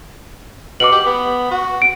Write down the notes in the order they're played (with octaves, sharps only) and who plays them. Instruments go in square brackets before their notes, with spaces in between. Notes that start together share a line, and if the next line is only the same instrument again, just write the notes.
[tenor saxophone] B2 [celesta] D6 F#7
[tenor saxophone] G4
B3
F#4
[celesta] D7